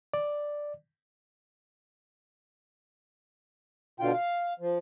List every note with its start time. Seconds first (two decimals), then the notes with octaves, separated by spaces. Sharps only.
0.14 D5
4.00 B2 D3 F4 G5
4.13 F5
4.60 F3